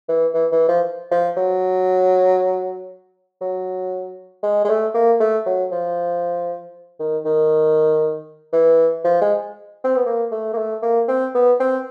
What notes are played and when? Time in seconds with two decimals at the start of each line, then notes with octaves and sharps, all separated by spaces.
0.09 E3
0.34 E3
0.52 E3
0.68 F3
1.11 F3
1.37 F#3
3.41 F#3
4.43 G#3
4.65 G#3
4.69 A3
4.94 A#3
5.20 A3
5.46 F#3
5.72 F3
7.00 D#3
7.25 D#3
8.53 E3
9.04 F3
9.21 G#3
9.84 C4
9.96 B3
10.06 A#3
10.32 A3
10.53 A#3
10.58 A3
10.82 A#3
11.08 C4
11.35 B3
11.60 C4